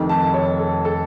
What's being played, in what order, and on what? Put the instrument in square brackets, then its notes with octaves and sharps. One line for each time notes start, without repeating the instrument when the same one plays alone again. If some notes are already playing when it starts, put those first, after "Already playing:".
Already playing: [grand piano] F1 F2 D#3
A5
C#5
A4
A4